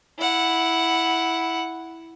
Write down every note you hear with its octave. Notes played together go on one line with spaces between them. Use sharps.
E4 F#5